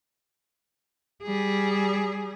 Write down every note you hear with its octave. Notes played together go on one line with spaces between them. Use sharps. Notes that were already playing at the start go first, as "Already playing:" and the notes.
G3 G#4